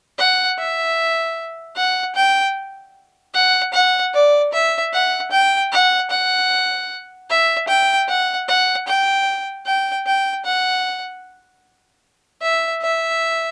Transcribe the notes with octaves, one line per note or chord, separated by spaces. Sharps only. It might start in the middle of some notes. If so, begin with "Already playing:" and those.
F#5
E5
F#5
G5
F#5
F#5
D5
E5
F#5
G5
F#5
F#5
E5
G5
F#5
F#5
G5
G5
G5
F#5
E5
E5